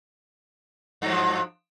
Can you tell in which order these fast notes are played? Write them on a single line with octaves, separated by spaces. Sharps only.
G2 F#3 F3